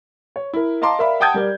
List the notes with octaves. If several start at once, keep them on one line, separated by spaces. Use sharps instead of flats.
C#5
E4 A#4
D#5 F5 A5 A#5 C6 D6
A#4 D5 E5 F5 B5
F#5 G5 A5 D#6 G6 G#6
G3 A#4 D5